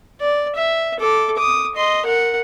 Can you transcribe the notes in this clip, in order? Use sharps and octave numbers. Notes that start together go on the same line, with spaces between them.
D5
E5
A4 D6
D6 D#6
D#5 C6
A#4 F#5